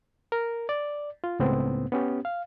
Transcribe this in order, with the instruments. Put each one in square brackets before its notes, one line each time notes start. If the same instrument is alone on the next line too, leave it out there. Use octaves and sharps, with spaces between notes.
[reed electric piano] A#4
D5
F4
C#2 A2 B3 C4
B3 C#4 G4
F5